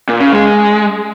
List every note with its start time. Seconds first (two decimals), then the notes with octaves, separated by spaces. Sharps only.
0.09 A#2
0.20 C#3
0.32 G#3